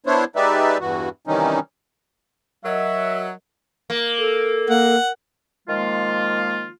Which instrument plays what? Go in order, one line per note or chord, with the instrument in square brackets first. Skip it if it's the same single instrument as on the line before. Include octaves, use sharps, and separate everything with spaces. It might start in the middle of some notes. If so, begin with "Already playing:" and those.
[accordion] B3 D4 E4 C5 C#5
G#3 D#4 G4 B4 D5 E5
E2 G2 E3 F#4
C3 D#3 E3 G3 C#4 D#4
[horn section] F#3 [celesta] A#4 D#5 [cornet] E5
[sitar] A#3
[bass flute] A4
[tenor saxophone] A#3 [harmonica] F#5
[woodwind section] D#3 F3 G#3 A#3 F4